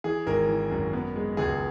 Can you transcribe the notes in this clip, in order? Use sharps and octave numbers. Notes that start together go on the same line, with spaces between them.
E3 G#4
G#1 A#4
E3
F#2
B3
G#3
C#2 G#4